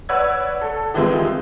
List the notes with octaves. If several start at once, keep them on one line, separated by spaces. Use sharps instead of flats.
B4 C#5 D5 F#5 E6 G#6
A4
D#3 E3 G3 G#3 C4 F4